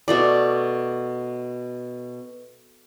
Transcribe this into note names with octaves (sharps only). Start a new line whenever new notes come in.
B2 A3 D5